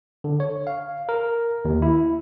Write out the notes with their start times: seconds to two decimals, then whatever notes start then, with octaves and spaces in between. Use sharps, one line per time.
0.24 D3
0.40 C#5
0.67 F5
1.09 A#4
1.65 D#2
1.82 E4